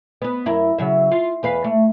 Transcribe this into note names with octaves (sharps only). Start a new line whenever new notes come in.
B3 B4
F#2 E4 A#4
C#3 F#3 E5
F4
E2 B4 F5
A3